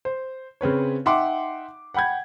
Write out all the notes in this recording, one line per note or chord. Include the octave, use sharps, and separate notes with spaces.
C5
C#3 C4 B4 C#5
D#4 E5 F#5 G5 C6 D6
F#5 G5 B5 G6 G#6